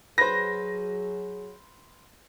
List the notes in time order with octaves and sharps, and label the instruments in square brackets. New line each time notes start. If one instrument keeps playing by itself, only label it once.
[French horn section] F#3 G#4 [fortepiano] B4 C5 [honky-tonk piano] A#6